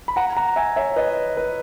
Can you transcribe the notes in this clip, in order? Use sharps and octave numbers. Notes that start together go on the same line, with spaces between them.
B5
F#5 A#5
F#5 A#5
E5 G#5
C#5 E5
B4 D#5
B4